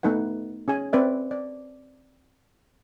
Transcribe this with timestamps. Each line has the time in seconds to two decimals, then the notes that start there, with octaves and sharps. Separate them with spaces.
0.03 A3 B3 D#4 B4 F#5
0.68 C#4 G#4 G#5
0.93 C4 B4 D5 E5
1.31 D5